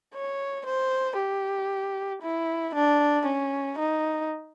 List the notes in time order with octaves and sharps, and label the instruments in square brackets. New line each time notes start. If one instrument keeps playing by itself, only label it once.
[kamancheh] C#5
C5
G4
E4
D4
C#4
D#4